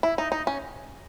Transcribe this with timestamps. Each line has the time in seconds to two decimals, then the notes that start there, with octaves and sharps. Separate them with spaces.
0.03 E4
0.18 D#4
0.32 D#4
0.47 C#4